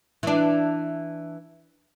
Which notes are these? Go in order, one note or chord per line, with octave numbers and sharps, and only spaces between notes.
E3 D4